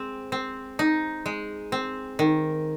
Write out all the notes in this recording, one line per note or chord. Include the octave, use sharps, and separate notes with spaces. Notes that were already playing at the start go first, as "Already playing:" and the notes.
Already playing: G#3 C4
C4
D#4
G#3
C4
D#3